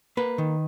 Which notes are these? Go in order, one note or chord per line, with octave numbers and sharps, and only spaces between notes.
A#3 B4
D#3